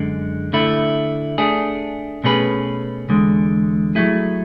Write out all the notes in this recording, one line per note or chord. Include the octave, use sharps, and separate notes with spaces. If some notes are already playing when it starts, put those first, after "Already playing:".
Already playing: F#2 D3 G#3
D3 A3 E4
A3 D4 G#4
B2 A3 C#4 G#4 B4
E2 D3 G#3
F#3 A3 E4 G#4